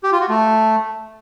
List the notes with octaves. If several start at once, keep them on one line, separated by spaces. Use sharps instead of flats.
G4
F4
F#4
A3